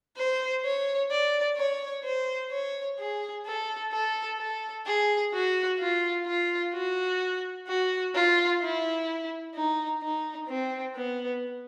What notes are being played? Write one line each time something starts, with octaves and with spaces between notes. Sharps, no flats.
C5
C#5
D5
C#5
C5
C#5
G#4
A4
A4
A4
G#4
F#4
F4
F4
F#4
F#4
F4
E4
D#4
D#4
C4
B3